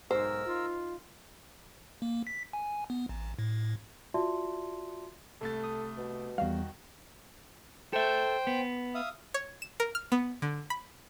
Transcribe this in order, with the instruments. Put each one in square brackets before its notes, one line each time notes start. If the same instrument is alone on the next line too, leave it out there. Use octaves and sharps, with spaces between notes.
[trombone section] B1 G#2 [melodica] A#4 E6 [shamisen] C5
[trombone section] D#4 F4
[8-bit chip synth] A#3
B6
G#5
B3
A1
A2
[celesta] F4 F#4 D5 E5 A5 C6
[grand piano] C2 A3 A6 [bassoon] A4
[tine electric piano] D#6
[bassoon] B2
[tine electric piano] E2 G3 [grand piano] D#3 F#4 [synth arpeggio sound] F5
[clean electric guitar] A4 E5 [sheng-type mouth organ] C5 G5
[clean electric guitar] B3
[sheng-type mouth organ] E5 F5 D#6
[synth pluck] C#5
E7
A#4
F6
B3
D3
B5